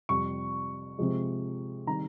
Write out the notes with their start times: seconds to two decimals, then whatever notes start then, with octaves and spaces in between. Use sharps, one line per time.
0.09 F2 C3 G3 C#6
0.98 C3 F3 G#3
1.87 D#3 G3 C4 D#4 A#5